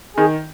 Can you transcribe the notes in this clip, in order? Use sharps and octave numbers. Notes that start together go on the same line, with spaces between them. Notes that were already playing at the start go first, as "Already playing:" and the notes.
D#3 G#4